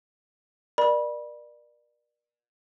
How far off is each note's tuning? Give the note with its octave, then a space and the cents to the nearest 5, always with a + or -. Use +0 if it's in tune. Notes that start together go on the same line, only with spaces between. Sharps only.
A#4 +35 D5 +25 B5 -25